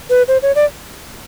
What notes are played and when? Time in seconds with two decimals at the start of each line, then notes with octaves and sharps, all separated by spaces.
0.10 B4
0.28 C5
0.43 C#5
0.55 D5